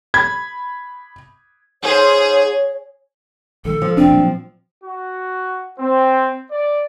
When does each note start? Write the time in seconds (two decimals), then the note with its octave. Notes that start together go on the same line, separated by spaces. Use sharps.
0.14 B5 G#6
1.83 G#2 G#4 C5 C#5
3.65 A#1 D#3 G#3 A4
3.82 F3
3.97 F1 C4 D4
4.12 A#2 F#3
4.84 F#4
5.78 C4
6.52 D5